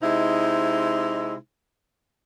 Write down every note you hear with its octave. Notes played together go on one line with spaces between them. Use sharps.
C3 G#3 D#4 E4